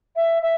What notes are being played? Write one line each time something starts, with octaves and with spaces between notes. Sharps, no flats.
E5
E5